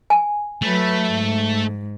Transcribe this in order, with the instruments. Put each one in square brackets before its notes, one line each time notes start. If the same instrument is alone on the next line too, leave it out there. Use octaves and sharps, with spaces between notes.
[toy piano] G#5
[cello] F#3 B4 [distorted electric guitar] A3
[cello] G#2